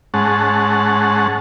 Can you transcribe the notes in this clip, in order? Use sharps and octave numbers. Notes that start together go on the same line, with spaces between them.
G#2 G#3 C#4 F#5 A5